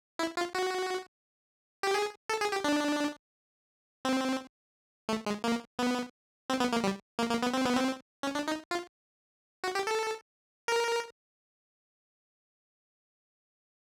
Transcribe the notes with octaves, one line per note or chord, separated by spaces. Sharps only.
E4
F4
F#4
G4
G#4
A4
G#4
G4
D4
C4
A3
G#3
A#3
B3
C4
B3
A#3
G3
A#3
A#3
B3
C4
B3
C4
C#4
D4
D#4
F4
F#4
G4
A4
A#4